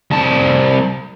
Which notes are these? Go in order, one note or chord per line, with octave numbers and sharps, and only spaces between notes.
C2 A5